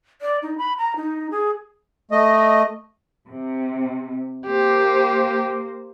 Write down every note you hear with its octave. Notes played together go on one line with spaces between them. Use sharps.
D5
D#4
B5
A#5
D#4
G#4
A3 D#5
C3
A#3 G4 C5